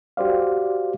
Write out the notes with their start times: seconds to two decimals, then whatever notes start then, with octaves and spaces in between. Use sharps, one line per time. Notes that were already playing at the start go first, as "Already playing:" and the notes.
0.17 F#4 G4 C5 D5 F5